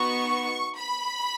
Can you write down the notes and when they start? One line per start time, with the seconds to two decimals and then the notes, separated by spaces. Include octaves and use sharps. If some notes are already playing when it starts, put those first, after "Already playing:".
Already playing: B3 D#4 F#4 C#6
0.77 B5